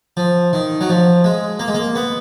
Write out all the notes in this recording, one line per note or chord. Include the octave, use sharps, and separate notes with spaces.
F3
D#3
F#3
F3
G#3
A#3
G#3
A#3
B3